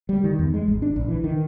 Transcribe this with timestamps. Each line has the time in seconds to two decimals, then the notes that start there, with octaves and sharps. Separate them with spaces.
0.09 G3
0.24 D#3
0.39 E2
0.54 G#3
0.68 G#1
0.82 D4
0.96 A#1
1.08 E3
1.24 D#3